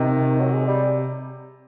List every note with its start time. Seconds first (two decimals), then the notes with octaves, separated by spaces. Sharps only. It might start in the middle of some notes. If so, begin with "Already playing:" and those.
Already playing: C3 D#3
0.39 F#3
0.53 G#3
0.67 G3